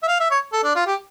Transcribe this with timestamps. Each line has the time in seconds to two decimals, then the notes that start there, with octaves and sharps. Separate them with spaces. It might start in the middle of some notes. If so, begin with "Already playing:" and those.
0.03 E5
0.08 F5
0.20 E5
0.31 C#5
0.53 A4
0.64 D4
0.75 F4
0.87 G4